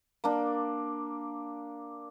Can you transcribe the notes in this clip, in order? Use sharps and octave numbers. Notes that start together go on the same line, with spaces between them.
A#3 D4